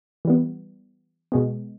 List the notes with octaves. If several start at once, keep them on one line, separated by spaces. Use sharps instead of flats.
E3 G3 B3
B2 G#3 B3